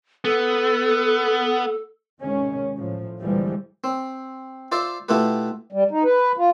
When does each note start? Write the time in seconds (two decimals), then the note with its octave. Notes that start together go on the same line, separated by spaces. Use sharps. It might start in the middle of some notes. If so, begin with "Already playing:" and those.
0.25 B3 A4
2.19 D#2 C3 D#3 G#3 C#4
2.78 A2 F3
3.20 D2 A#2 E3 F3 G3 G#3
3.84 C4
4.72 F4 C5 D5 E5
5.09 B2 A3 E4 F4 G4 B4
5.72 G3
5.91 D#4
6.04 B4
6.37 F4